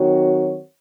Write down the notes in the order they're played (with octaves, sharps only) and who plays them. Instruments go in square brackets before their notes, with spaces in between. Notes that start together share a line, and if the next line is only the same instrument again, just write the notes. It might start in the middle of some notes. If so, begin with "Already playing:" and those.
Already playing: [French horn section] D#3 F#3 C4 F#4 C#5